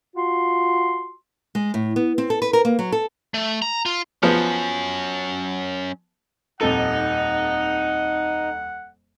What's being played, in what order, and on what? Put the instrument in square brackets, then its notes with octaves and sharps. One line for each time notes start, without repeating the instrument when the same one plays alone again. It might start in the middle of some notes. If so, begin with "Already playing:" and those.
[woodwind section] F4 F#4 C6
[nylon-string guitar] G#3
A2
B3
C4
A4
B4
A#4
A#3
F#3
A4
[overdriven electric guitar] A3
A#5
F4
[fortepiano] F3 B3 [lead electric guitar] F#3 C#4
[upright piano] D#1 F2 A4 [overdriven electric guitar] D#4 [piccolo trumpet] F#5